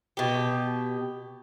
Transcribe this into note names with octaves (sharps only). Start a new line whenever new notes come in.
B2 G4